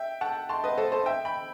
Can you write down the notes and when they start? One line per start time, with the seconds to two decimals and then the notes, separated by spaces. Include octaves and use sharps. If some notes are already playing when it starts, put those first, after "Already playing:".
Already playing: E5 G5
0.21 F#5 A5
0.49 A5 C6
0.64 B4 D#5
0.78 A4 C5
0.92 A4 C5
1.06 E5 G5
1.25 G5 B5